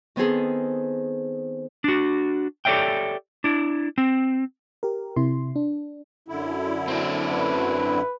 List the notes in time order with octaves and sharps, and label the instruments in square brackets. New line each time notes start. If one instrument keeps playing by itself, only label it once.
[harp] D#3 B3 C4 G#4 A4
[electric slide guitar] D4 F#4
G4 A4 C#5 D5 E5 G5
D4 E4
C4
[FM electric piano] G4 A#4
C3 E4 C6
D4
[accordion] F#2 D3 E4
[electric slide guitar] C4 D4
[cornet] B4